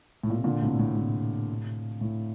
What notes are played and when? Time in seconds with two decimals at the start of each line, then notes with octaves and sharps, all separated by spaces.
0.23 A2
0.30 A#2
0.37 C3
0.44 A#2 D3
0.62 A2 C3
0.79 A2 C3
0.96 A2 C3
2.01 A2